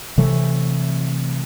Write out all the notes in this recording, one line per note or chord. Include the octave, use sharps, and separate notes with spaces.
C3 E3 F#3 A3